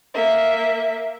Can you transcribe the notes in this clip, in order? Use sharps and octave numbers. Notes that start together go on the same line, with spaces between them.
A#3 E5